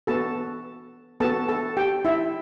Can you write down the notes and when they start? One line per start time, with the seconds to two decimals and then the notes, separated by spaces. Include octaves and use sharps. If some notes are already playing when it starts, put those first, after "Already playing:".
0.07 B3 F#4 A4 A5
1.20 B3 F#4 A4 A5
1.49 A4 A5
1.77 G4 G5
2.05 E4 E5